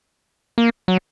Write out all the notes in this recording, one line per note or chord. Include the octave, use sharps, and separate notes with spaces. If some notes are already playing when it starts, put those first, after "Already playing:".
A#3
F#3